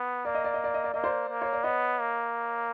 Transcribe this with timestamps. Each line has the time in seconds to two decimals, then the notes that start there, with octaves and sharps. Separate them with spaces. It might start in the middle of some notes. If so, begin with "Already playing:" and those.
Already playing: B3
0.25 A#3 D5
0.35 D#5
0.44 D5
0.54 D#5
0.64 D5
0.74 D#5
0.84 D5
0.94 A#3 D#5
1.04 C5 D5
1.29 A#3
1.42 C#5
1.53 D5
1.64 B3 C#5 D#5
1.99 A#3